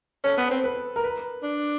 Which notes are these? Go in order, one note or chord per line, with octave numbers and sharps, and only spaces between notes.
C#4 A4
B3
C4
B4
A#4
B4
D4